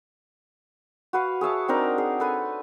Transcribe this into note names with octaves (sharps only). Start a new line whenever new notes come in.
F#4 B4 F5
G#4 C#5 E5 A5
C4 D4 D#4 A#4
G#4
A4 B4 G#5